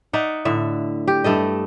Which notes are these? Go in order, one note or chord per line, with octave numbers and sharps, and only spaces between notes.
D#4 D5 E5 F#5
A2 D3 E5
G4
G2 A3 A4 D#5